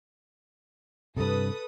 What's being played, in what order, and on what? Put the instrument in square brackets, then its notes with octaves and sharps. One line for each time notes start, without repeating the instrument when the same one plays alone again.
[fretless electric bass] G2 C3 [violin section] A4 B4 D#6